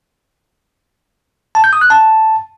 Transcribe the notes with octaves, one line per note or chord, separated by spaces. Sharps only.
A5
G6
D#6
F#6
A5